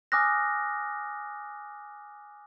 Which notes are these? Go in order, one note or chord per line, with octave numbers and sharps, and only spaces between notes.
G#5 D6 D#6 F6 F#6 A#6